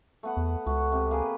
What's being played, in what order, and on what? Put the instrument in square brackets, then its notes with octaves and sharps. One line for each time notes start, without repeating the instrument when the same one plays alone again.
[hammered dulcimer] A3 B3 F#5
[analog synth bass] E2
[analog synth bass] C#2 [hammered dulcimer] A3 F#4
[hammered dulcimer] C3 G4
A#3 G#4 B4